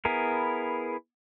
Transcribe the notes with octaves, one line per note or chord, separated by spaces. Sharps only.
B3 E4 G#4 A#4